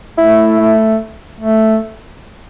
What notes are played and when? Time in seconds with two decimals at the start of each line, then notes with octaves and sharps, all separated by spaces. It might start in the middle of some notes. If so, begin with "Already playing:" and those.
0.18 A3 E4
0.59 A3
1.40 A3